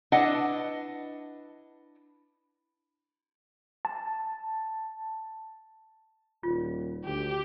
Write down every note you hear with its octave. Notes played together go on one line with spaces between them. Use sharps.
D4 E4 B4 D#5 F#5
A5
D#1 F4
D2 G4